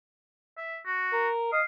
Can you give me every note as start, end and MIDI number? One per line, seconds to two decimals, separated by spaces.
0.58 0.77 76
0.86 1.29 66
1.12 1.51 70
1.53 1.61 75
1.53 1.64 77